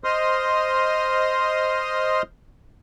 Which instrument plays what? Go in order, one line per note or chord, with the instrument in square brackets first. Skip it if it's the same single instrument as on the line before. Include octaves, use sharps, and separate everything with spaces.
[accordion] C5 D#5 C6 D#6 F6